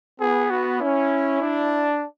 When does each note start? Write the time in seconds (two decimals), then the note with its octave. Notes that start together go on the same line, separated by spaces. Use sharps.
0.20 B3 G#4
0.50 F#4
0.80 C#4 E4
1.41 D4